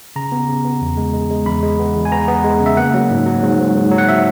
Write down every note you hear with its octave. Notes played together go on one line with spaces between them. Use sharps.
C#3 A#5
B3
C#3
B3
E2
G#3
G#3
G#3
E2 B5
G#3
B3
E2
G#5
B3 A#5
B3
G#3
C#3
E5
A#3 F#5
F#3
G#2
F#3
G#2
G#2
G#2
F#3
F#5
E5